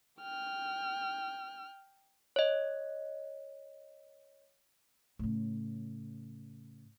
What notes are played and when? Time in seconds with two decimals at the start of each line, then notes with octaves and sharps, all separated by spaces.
0.21 G5 F6
2.36 C#5 D#5
5.19 A2 C#3